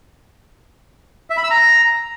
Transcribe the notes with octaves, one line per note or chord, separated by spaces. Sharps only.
E5
B5
E6
A#5